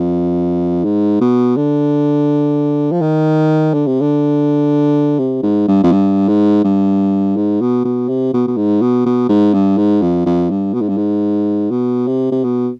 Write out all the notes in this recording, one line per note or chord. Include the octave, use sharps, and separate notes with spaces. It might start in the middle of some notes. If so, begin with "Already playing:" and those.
Already playing: F2
G#2
B2
D3
F3
D#3
D3
C3
D3
C3
G#2
G2
F2
G2
G#2
G2
G#2
B2
B2
C3
B2
B2
G#2
B2
B2
G#2
G2
G#2
F2
F2
G2
B2
G#2
G2
G#2
B2
C3
C3
B2